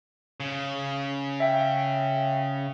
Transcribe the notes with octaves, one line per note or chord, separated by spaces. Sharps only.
C#3
E5 G5